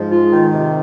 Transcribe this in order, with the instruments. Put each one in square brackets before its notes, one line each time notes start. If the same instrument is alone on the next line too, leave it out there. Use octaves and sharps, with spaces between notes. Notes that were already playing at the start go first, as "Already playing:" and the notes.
Already playing: [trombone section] G#2 G#3 [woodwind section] F3
[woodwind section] F4
D#3
C3